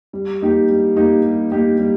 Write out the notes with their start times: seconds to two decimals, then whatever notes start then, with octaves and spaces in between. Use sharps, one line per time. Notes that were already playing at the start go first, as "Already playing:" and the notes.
0.13 G3
0.41 A#3 D#4 G4
0.69 G3
0.96 A#3 D#4 G4
1.24 G3
1.52 A#3 D#4 G4
1.79 G3